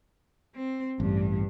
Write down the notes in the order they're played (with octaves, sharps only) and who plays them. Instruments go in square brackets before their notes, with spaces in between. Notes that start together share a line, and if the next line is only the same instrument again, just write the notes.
[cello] C4
[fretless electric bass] A1 [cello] G2